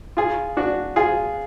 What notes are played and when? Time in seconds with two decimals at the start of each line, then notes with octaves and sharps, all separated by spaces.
0.17 F4 G#4
0.57 D4 F#4
0.96 F4 G#4